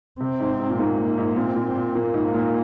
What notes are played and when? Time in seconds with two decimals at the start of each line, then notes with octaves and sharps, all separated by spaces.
0.20 C3 C4
0.40 G#2
0.60 G#2
0.70 A#2
0.79 G#2 A#3
0.98 A#2
1.18 G#2
1.37 A#2 C4
1.56 A#2
1.75 A#2
1.95 A#2 A#3
2.14 G#2
2.34 A#2